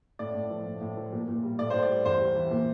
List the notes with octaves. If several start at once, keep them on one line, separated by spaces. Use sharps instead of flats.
A2 D5
A2
F3
A2
A2
F3
A#2
A#2
G3
A2 D5
A2 C5
D5
G3
E2 C5
G3
E3
A#2